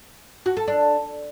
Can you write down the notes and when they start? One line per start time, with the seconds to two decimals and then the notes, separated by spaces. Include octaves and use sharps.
0.46 F#4
0.57 A4
0.68 D4